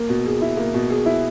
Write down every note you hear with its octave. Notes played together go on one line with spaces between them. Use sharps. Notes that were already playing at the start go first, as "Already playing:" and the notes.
Already playing: A#3
B2
G#4
E4
A#3
B2
G#4
E4